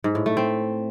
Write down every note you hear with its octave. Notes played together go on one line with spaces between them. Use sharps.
G#2
A2
A3
C4